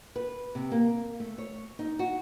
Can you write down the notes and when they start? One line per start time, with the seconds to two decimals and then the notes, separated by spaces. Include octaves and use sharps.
0.16 B4
0.55 C3
0.72 A#3
1.20 A3
1.38 C#5
1.79 D#4
1.99 F#4